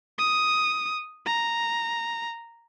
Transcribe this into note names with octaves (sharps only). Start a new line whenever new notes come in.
D#6
A#5